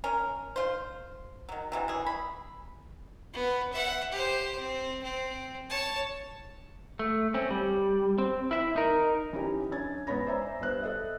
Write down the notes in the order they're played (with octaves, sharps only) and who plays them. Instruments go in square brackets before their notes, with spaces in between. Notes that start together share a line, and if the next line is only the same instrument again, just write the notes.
[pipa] C#4 A#4
F4 C5
D#3 F#3
C3 E3 F#3
E3 G#4
B5
[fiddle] B3
E5 F#5
G4 C5
C4
C4
C#5 A5
[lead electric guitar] A3
C4 C#4
G3
C4
E4 E5
D#4 A#4
[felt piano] E3 C#4 D#4 G4
F#2 D4 C#5 G#6 A6
G#2 B3 C#4 C#5 B5 A#6
C5 D5 E5 G#5 A#5
G2 B3 C5 F#6
A4 D#5 E5